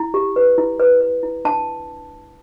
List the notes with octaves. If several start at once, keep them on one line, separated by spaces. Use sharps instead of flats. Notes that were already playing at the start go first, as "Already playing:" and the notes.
Already playing: E4
G4
B4
E4
B4
B4
E4
D4 A5